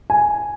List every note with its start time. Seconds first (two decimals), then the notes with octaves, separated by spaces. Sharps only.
0.10 G#5